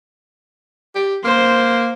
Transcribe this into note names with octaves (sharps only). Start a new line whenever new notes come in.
G4
A#3 C5